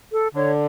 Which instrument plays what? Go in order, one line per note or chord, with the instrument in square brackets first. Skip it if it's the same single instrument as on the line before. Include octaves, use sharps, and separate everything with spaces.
[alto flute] A4
[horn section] D3 [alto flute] C#5